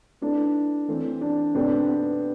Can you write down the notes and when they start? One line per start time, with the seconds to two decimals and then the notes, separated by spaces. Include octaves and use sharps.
0.21 A3 D4 E4 B4
0.88 E3 A3 C4
1.21 D4
1.54 B2 A3 C4 D4 G4 B4
1.88 B3